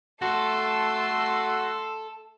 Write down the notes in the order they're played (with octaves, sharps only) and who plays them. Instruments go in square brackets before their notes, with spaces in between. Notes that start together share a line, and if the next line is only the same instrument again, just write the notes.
[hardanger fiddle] A3 [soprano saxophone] F#4 [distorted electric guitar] A4 [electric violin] C6 E6